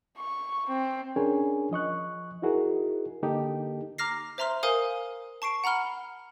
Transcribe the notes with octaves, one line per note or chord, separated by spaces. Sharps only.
C#6
C4
C#4 D4 G#4 A#4 C#5 G#5
F3 D#5 C#6 F#6
D#4 E4 F#4 G#4 A#4
D3 A#3 D#4 G4 A4
A#5 D6 F6 A#6 C7
C5 E5 A#5 C6 F6
A#4 C5 F5 G#5 D#6
A5 C#6 C7 D7
F#5 A#5 B5 F6 G7